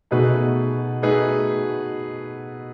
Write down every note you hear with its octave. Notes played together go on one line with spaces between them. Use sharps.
B2 A3 D#4 G#4 B4
A3 D#4 G#4 B4